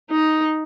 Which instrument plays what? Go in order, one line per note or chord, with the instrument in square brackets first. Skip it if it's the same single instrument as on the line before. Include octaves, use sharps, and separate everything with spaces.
[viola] D#4